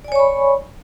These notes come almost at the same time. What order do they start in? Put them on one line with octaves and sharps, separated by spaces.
D5 G#5 C#5 C#6 B5